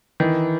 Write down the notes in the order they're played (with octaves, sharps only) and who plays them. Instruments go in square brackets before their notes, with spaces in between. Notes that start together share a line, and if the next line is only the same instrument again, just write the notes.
[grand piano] D#3 [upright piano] E3